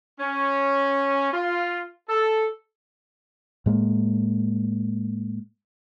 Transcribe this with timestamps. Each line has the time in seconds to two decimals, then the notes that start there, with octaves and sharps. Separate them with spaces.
0.20 C#4
1.33 F4
2.09 A4
3.66 A2 G#3 A#3